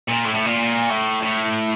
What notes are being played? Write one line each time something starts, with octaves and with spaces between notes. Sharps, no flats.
A#2
A2
A2
A#2
A2
A2